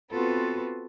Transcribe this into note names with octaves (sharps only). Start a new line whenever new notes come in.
B3 C4 F4 F#4 A4 B4